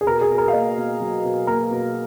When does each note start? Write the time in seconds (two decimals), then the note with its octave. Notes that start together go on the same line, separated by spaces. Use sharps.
0.01 G#4
0.06 B2 A#4
0.21 G#4
0.30 B2
0.38 A#4
0.48 F5
0.53 A#3 D#5
0.77 B2
1.00 F#3
1.24 B2
1.47 A#3 A#4
1.71 B2